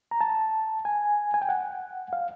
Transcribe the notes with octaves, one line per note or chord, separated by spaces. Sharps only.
A#5
A5
G#5
G#5
G5
F#5
F5